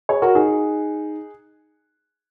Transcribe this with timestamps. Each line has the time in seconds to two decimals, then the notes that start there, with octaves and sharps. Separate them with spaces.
0.09 G#4 C#5
0.22 F#4 A#4
0.35 D#4 G#4